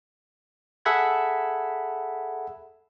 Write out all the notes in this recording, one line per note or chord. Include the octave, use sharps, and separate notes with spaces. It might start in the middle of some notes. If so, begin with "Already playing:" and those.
G#4 A4 E5 F#5 B5 G#6